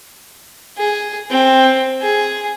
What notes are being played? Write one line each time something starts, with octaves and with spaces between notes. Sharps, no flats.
G#4
C4
G#4